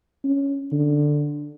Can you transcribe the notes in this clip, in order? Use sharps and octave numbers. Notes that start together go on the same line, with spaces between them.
C#4
D3